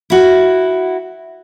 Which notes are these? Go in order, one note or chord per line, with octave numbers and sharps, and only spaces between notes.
E4 F#4